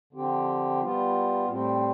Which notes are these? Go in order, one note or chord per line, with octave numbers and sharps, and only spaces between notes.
D3 F3 C4 G4
G3 B3 F4
A2 G3 C4